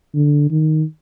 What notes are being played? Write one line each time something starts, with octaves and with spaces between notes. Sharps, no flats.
D3
D#3